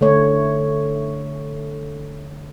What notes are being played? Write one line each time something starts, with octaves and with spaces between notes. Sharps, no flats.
D3 A3 C#5